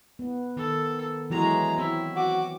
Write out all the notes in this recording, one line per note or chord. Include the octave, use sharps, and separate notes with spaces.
B3
D#3 A4
E3 F#3 G#3 F#4 A#5
C4 E4
F#4 D6